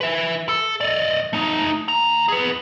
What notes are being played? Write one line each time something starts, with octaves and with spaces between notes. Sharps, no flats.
B4 E5
A4
D5 D#5
A3 D#4
D#2 A#5
G#4 B4